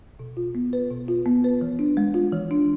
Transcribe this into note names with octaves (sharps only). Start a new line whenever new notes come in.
B2
F4
B3
B4
B2
F4
B3
B4
E3
D4
G#3
F4
E3
D4